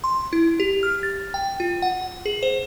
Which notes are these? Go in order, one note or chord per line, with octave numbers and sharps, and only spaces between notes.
C6
E4
G4
F6
A6
G5
F4
F#5
G#4
C5